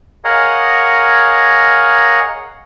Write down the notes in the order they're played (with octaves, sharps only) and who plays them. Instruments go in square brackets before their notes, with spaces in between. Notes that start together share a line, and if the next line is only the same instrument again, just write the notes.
[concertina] G#4 A#4 C#5 D#5 F5 F#5